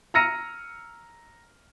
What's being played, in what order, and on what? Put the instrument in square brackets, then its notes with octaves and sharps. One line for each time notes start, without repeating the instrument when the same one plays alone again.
[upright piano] A#5 E6 F6 A#6 C#7 D#7